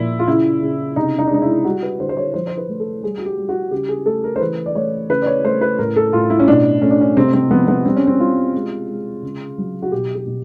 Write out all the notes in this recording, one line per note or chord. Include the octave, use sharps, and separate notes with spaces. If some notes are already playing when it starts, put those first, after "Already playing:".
Already playing: A#2 F3 E4
F4
C#3 E4
C#3
C3 D#4
D#4
D4
G#3 D#4
E4
G3 F#4
B4
D3 C5
C5
C#5
F3 C5
C5
B4
A3
A4
G3 G#4
F#4
G4
G3
F#4
C#3 G4
G#4
A3 A4
A#4
C5
E3 B4
D5
A3 C#5
C#3 B4
D5
C#5
A3 C5
B4
A2 A#4
A4
A2 F4
E4
C#4
B2 D4
A3 C#4
D4
C#4
C3 C4
C4
F3 B3
B3
G3 C4
C#4
C4
G3 F4
G#3
G#3
C#3
F#3
F#4
B2 G4
G4
B2